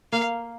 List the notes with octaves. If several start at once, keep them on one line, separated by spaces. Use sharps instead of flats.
A#3 F5